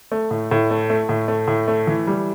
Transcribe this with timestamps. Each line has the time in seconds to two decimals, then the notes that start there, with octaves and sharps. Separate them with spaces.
0.12 A3
0.31 A2
0.51 A2
0.71 A3
0.90 A3
1.09 A2
1.28 A3
1.48 A2
1.68 A3
1.87 E3
2.07 G3